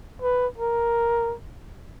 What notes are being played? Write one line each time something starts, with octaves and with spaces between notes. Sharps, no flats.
B4
A#4